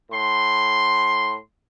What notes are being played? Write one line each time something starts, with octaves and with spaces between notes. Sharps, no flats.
A2 C6